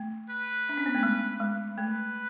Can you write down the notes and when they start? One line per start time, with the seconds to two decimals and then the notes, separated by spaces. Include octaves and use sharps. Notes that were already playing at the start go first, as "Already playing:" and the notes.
Already playing: A3
0.30 B4
0.69 D4
0.78 C#4
0.86 B3
0.95 A3
1.03 G#3
1.40 G#3
1.77 A3 B4